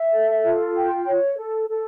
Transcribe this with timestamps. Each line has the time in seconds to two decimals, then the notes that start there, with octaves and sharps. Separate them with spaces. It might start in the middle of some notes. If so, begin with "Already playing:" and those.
Already playing: E5
0.13 A4
0.44 F4
0.76 G5
1.07 C#5
1.38 A4
1.69 A4